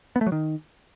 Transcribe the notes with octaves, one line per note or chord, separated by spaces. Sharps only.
B3
A3
F#3
D#3